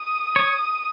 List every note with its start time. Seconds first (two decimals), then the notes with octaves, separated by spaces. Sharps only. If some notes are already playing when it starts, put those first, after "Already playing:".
Already playing: D#6
0.36 C#5